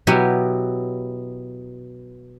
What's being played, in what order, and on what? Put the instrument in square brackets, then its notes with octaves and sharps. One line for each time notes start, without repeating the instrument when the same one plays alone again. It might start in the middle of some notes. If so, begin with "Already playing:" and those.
[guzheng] B2 F#3 B3 E4 G4 G#5